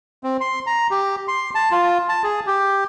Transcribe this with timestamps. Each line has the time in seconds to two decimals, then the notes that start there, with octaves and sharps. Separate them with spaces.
0.24 C4
0.41 C6
0.67 A#5
0.91 G4
1.28 C6
1.55 A5
1.71 F4
2.09 A5
2.24 G#4
2.47 G4